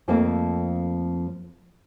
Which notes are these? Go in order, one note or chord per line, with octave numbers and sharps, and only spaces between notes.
F2 F3 A3 A#3 C4